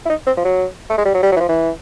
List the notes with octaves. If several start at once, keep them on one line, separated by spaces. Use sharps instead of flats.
E4
D#4
C4
F3
F#3
A3
G#3
G3
F#3
G3
F#3
E3
F3
E3